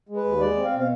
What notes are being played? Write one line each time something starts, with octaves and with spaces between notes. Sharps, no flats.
G#3
B4
D#2
G#3 D5
C4
F5
B2
F5